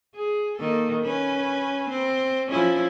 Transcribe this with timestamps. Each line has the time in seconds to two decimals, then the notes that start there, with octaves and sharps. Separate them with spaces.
0.15 G#4
0.58 D#3 A#3 A4
1.04 C#4 B4
1.90 C4
2.50 F3 C#4 E4